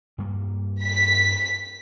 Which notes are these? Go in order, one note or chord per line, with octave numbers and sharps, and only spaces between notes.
G2 G3 A#3
B6